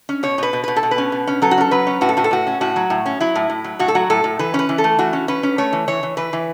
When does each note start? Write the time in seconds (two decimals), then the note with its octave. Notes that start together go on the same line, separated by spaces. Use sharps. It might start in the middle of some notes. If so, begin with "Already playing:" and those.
0.09 C#4
0.23 B2 C#5
0.38 B2 B4
0.53 B2
0.64 B2 B4
0.76 A4
0.83 B2
0.91 B4
0.98 C#4
1.12 B2
1.27 C#4
1.42 F#3 A4
1.51 F#4
1.58 C#4 A4
1.71 F#3 B4
1.87 C#4
2.01 A2 F#4
2.09 A4
2.17 A2 F#4
2.24 A4
2.31 A2 F#4
2.47 C#4
2.61 A2 F#4
2.76 F#3
2.90 A2
3.06 C#4
3.21 F#3 E4
3.35 A2
3.50 A2
3.64 F#3
3.79 A2 F#4
3.88 A4
3.95 F#3 F#4
4.10 A2 A4
4.24 A2
4.39 E3 B4
4.54 C#4
4.59 B4
4.69 E3
4.78 A4
4.84 A3
4.98 E3 F#4
5.13 C#4
5.28 C#4 B4
5.43 C#4
5.58 A3 C#5
5.73 E3
5.88 E3 C#5
6.03 E3
6.17 E3 B4
6.33 E3